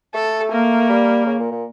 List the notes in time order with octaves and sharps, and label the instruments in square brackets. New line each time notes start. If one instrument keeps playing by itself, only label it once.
[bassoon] A3 [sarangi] A4
[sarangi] A#3
[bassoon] G3
C#3
A#2
A#2